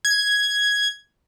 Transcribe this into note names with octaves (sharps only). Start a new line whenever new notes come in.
G#6